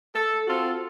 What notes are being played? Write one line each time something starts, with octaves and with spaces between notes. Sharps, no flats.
A4
C4 F4 F#4 A4